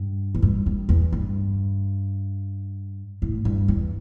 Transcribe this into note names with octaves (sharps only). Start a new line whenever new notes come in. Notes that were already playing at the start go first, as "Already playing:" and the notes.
Already playing: G2
E2
G2
G2
E2
G2
A2
G2
E2